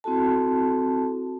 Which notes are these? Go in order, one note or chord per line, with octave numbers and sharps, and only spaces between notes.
C4 E4 F#4 A4 A5